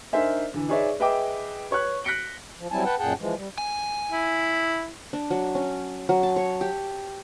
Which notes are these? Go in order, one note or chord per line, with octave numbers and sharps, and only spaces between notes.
D4 D#4 A#4 C5 E5 G#5
D3 E3
D#4 G#4 B4 C#5 D5 E5
G#4 B4 D#5 E5 G5 D6
B4 C#5 C#6 F#6
F#6 A#6 B6 C#7 D7 G7
F3
F#3 G3 C4 E4 G#5 A5
B4 F#5 G5 A5
F#2 A#2 G#4 F#5 G5 A5
E3 F3 G#3
G3
G#5
E4
D4
F#3
C#4
F#3
A5
C#5
G4